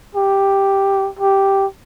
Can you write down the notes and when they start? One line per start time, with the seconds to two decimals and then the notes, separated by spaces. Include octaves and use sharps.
0.15 G4
1.19 G4